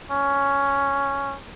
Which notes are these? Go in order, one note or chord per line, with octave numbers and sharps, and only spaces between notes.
C#4